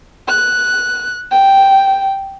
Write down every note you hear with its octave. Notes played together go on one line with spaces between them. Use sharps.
F#6
G5